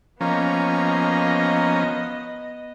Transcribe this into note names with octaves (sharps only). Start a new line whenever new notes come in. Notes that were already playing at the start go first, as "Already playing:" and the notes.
F3 A#3 B3 C#4 D#5 A#5